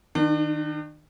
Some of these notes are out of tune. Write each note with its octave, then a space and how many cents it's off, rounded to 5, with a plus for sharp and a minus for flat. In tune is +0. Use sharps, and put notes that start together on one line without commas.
D#3 +0 D4 +40